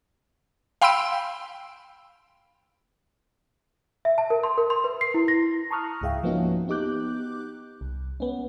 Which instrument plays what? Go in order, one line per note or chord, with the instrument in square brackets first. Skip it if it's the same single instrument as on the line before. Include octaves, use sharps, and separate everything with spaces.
[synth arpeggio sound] F5 G5 B5 C6 E6 D7
[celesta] E5
A5
A#4
C6
A#4
C6
B4
C7
E4
A#6
[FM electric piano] A5 A#5 C#6 D#6 F6 F#6
C#2 G#2 G#4 E5 F5 G5
F3 A#3 B3 C#4 D#4 F#4
B3 D#4 G4 D6 F#6 G6
C2
B3 C#4